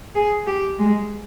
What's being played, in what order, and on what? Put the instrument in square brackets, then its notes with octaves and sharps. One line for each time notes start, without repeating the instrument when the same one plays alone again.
[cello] G#4
G4
G#3